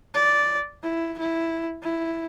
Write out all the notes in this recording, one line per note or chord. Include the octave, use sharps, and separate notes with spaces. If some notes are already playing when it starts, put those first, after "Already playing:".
D5
E4
E4
E4